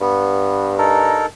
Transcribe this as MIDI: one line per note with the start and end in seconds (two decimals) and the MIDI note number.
0.01 1.28 43
0.01 0.75 59
0.78 1.26 63
0.78 1.26 69
0.78 1.26 70